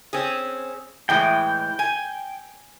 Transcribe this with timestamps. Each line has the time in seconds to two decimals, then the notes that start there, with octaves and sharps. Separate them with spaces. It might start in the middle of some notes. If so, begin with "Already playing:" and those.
0.13 C4 C#4 G#4
1.09 A2 E3 G#3 G5
1.79 G#5